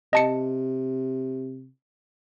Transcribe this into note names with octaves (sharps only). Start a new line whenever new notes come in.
C3 D#5 A5 C#7